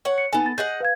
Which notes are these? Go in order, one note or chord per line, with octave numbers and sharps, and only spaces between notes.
C#5 F#5
C#7
B3 D#4 A4 G#5
A6
G#4 D#5 F#5 G6
B4 F5 G#6